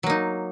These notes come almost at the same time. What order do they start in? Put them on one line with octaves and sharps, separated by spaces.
F#3 A#3 D#4